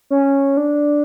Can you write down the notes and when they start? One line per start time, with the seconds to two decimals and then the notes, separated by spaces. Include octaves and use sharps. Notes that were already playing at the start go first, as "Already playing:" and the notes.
0.10 C#4
0.57 D4